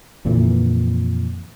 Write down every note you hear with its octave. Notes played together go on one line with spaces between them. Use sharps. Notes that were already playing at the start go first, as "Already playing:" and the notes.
F2 A#2 D3 E3